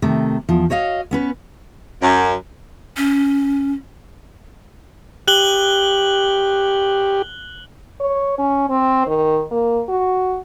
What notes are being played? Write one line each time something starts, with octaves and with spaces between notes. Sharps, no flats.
C3 D#3 A3
E2 F3
F#4 C#5 D#5 F5
B3 C#4 B4
F#2
C#4
G4 F#6 F#7 G7
C#5
C#4
C4
D#3
A#3
F#4